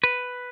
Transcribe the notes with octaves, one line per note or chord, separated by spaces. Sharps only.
B4